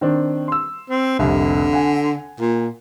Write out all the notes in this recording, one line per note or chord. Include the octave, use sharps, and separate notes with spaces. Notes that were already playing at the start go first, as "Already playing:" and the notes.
D#3 C4 D4
C6 E6
C4
F1 C2 D3
F#5 G#5
A#2